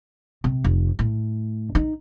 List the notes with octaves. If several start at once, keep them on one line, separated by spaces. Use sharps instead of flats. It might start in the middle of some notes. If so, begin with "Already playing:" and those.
C3
F1
A2
D#4